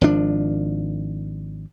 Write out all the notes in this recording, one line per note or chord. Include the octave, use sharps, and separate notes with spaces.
G#1 F3 D4